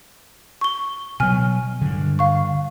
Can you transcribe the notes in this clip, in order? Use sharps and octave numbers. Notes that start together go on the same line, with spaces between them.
C#6 G7
B2 F#3 G#5 F6
G2 D3
F5 C#6